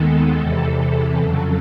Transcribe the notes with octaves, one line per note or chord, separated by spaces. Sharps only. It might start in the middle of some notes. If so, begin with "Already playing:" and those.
Already playing: D#2 D#3 G#3 B3 A4
E2 C3 E3
F2 C#3 F#3 A4